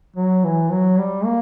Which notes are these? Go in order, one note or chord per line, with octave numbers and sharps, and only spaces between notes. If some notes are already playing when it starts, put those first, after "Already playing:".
F#3
E3
F#3
G3
A#3